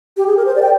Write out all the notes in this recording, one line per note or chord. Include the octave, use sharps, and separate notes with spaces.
G4
G#4
A#4
C5
D5
G5